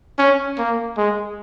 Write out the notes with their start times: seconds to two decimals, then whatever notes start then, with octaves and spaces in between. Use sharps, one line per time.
0.19 C#4
0.58 A#3
0.97 G#3